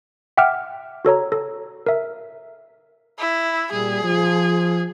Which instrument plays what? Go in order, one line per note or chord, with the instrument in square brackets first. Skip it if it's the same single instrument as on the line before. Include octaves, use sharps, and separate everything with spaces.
[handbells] E5 F#5 G5 D6 F6
F#4 A4 C#5 A#5
A4
A#4 E5
[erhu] E4
[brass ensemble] A#2 G3 [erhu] G#4
[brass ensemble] F3